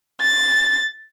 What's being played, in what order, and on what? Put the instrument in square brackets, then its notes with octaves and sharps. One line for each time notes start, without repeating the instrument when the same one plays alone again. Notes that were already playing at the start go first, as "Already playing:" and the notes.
[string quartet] A6